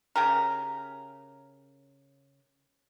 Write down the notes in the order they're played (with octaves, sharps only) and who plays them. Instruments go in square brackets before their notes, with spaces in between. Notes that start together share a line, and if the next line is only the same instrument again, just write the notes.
[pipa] C#3 G4 A#4